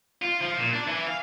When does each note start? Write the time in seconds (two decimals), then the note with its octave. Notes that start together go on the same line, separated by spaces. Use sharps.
0.22 F4
0.41 F3
0.58 A#2
0.73 D4
0.87 E3
1.07 F5